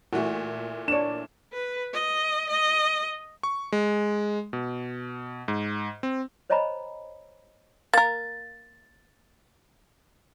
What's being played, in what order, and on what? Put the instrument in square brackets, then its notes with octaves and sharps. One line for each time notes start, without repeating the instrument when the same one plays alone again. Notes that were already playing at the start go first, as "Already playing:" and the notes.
[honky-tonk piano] A#2 E3 A3 [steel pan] F#4
[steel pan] D4 C#5 [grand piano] D5 E7
[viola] B4
D#5
D#5
[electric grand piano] C#6
G#3
B2
G#2
C4
[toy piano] C5 C#5 D#5 G#5 A#5 B5
[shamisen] A#3 A#4 [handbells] A6